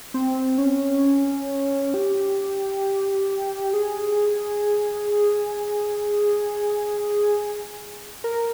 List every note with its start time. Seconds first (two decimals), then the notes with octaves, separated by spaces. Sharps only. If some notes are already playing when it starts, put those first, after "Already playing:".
0.14 C4
0.58 C#4
1.94 G4
3.73 G#4
8.24 A#4